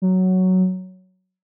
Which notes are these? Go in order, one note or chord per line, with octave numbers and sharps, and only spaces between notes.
F#3